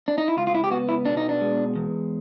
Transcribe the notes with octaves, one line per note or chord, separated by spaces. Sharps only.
D4
D#4
E4
C#2 F4
F4
E4
G4
B3 F#4
E4
B2 D4
D#4
D4
G#3
E2